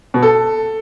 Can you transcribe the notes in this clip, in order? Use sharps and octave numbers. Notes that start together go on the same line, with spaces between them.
B2
A4